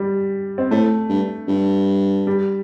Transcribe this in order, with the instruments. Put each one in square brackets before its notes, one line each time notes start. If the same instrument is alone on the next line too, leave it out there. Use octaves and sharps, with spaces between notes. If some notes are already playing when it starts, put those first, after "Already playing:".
Already playing: [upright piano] G3
C4
[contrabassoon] A2 [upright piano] A3
[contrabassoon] G2
G2
[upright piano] G3